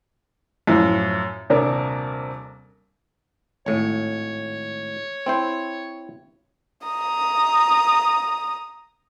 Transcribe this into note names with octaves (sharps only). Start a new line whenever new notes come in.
F#2 A2 F3
D#1 C3 D4 A#4
G#1 A2 C#5
C4 E4 C5
A#5 D#6